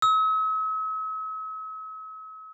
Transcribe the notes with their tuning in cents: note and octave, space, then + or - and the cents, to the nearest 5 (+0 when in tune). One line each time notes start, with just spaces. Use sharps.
E6 -45